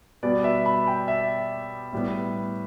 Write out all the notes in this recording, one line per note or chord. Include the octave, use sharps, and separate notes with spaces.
B2 G3 B3 D5
E5
B5
G5
E5
A2 G3 B3